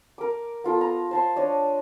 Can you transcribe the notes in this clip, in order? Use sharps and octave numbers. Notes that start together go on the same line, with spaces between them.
A#4 D6
B3 F4 A4
A#5
C5 A5 C6
D4 C#5 D#5